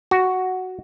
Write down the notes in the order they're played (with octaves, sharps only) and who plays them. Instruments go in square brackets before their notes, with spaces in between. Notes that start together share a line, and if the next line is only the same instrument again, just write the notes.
[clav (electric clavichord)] F#4